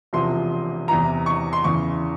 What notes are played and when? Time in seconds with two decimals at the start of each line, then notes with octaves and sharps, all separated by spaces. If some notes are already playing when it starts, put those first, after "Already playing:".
0.13 E1 E2 C3 F3 C6
0.88 E2 C3 E3 A#5
1.26 C#6
1.53 C6
1.64 E2 C#3 E3 C#6